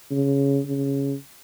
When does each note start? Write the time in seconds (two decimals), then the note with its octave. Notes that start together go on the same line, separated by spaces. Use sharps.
0.11 C#3
0.65 C#3